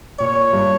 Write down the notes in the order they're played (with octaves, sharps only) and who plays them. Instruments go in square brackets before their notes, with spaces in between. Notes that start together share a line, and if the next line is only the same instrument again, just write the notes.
[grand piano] A#2 [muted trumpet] C#5
[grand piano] G2